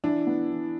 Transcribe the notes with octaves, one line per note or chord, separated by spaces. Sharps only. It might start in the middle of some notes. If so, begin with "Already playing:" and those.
E3 D4 E4
B3
E3